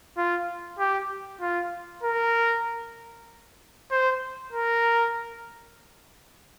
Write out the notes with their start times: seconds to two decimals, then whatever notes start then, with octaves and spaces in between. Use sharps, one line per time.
0.17 F4
0.79 G4
1.41 F4
2.03 A#4
3.91 C5
4.53 A#4